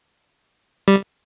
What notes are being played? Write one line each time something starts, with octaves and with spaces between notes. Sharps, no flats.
G3